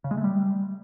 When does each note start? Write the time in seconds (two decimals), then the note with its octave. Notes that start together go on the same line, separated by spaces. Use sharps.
0.04 C#3
0.11 G#3
0.17 A3
0.24 G3